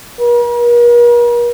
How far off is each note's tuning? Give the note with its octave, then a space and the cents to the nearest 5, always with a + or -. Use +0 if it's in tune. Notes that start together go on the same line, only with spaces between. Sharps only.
A#4 +45